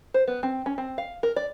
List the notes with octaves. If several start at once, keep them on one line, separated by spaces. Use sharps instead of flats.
C5
B3
C4
C#4
C4
F5
A#4
D5